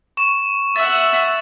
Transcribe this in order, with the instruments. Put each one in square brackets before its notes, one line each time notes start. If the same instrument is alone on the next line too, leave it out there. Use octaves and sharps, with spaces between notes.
[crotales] C#6 E7
[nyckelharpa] E5 F#5 [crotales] E6 A6